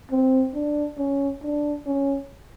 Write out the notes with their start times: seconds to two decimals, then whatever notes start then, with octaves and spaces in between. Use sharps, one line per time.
0.11 C4
0.55 D4
0.98 C#4
1.43 D4
1.86 C#4